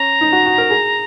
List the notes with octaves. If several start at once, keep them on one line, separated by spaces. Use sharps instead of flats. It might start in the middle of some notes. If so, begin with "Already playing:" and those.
Already playing: C#4 A#5
D#4
F#4
F#4
A#4
G#4